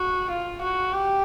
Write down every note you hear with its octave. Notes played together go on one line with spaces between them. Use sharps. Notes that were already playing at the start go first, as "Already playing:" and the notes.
Already playing: F#4
F4
F#4
G4